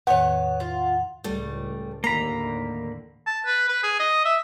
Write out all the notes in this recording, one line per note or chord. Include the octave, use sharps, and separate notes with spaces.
E2 A2 D#3 B3 C#5 F#5
F4
C#2 A2 G3 A3
D#2 A2 D3 A#3 A#5 B5
A5
B4
B4
G#4
D#5
E5